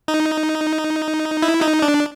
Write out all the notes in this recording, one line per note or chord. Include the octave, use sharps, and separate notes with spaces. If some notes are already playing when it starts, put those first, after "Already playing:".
D#4
E4
D#4
D4